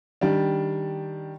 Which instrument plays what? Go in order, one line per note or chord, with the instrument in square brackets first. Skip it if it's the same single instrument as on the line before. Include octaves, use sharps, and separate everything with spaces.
[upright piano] D#3 G3 D4